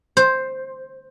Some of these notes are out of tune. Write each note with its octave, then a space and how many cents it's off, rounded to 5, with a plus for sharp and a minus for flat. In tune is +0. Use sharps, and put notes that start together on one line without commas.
C5 +5